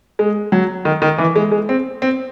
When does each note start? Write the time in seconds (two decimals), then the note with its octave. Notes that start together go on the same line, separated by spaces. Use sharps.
0.19 G#3
0.52 F#3
0.85 D#3
1.02 D#3
1.18 E3
1.36 G#3
1.52 G#3
1.69 C4
2.02 C4